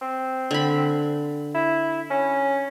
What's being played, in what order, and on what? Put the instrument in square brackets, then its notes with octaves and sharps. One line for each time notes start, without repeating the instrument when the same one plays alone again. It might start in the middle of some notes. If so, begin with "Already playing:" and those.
[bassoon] C4
[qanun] D3 B5
[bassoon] E4
C#4